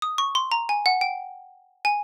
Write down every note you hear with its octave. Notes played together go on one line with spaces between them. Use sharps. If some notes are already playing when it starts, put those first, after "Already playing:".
D#6
C#6
C6
A#5
G#5
F#5
G5
G#5